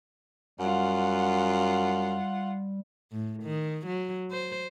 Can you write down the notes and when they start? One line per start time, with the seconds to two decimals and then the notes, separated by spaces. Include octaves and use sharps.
0.60 F#2 G3 F4 F#5
3.12 A2
3.43 D#3
3.86 F#3
4.31 C5